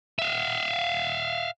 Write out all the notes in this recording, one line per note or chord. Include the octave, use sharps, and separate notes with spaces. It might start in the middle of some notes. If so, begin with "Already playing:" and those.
E5 F5